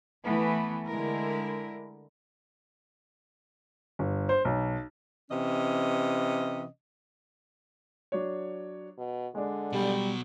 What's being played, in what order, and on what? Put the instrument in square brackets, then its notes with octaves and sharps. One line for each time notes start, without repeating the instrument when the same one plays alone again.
[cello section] E3 A3 B3
D3 G#3 E4 A#4
[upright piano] G1
C5
B1
[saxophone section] C3 E3 C#4 D#5
[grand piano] F#3 D4 C#5
[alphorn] B2
[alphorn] D3 [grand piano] G#3 D4
[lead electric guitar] B2 F#3 [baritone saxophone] G3